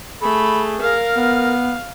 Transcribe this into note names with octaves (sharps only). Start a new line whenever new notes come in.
A3 G#4 B5
A#4 F5
B3